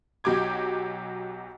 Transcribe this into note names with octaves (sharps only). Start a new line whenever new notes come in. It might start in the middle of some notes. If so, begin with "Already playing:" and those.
B1 F#3 G4 D6 G#6